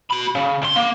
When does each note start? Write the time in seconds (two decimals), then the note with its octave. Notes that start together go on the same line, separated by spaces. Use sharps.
0.11 F#4 B5
0.35 C#3
0.62 C2 C6
0.76 A#3